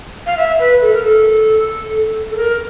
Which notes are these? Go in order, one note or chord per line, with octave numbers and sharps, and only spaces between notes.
F5
E5
B4
A4
A#4
A4
A4
A#4